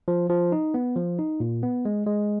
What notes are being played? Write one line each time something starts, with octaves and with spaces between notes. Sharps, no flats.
F3
F3
D#4
B3
F3
D#4
A#2
B3
G#3
G#3